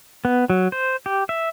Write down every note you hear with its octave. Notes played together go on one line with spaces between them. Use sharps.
B3
F#3
C5
G4
E5